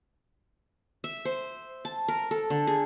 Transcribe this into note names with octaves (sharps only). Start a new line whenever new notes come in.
E5
C5
A5
A#4
A4
D3
G#4